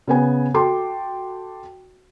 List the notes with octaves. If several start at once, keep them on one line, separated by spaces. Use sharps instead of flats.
C#3 B3 G#5
F#4 A4 G5 A5 C6 D6